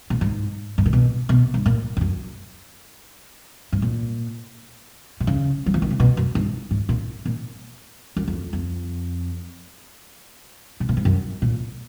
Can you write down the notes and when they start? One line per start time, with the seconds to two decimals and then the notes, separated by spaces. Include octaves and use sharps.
0.10 A#2
0.21 G#2
0.78 G#2
0.86 A#2
0.93 B2
1.29 B2
1.54 G#2
1.66 A#2
1.97 F2
2.01 F#2
3.72 G#2
3.82 A#2
5.20 B2
5.27 C#3
5.66 F#3
5.74 F3
5.82 D#3
5.91 C#3
6.00 B2
6.17 F#2
6.35 G#2
6.71 G#2
6.89 A#2
7.26 A#2
8.16 F#2
8.28 F2
8.53 F2
10.80 B2
10.89 A#2
10.97 G#2
11.05 F#2
11.42 A#2